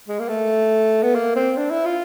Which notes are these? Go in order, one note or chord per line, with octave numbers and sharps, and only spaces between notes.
G#3
A#3
A3
B3
A#3
C4
D4
E4
F4